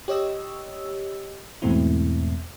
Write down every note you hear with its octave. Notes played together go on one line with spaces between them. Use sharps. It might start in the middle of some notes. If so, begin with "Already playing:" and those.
G4 C#5 D#5 E6
E2 G#2 B2 A3 C4 E4